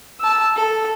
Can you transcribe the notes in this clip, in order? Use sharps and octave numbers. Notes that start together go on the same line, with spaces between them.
A5 E6
A4